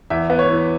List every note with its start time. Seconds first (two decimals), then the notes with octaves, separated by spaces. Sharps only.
0.10 E2 E5
0.30 B3
0.39 C#5
0.49 E3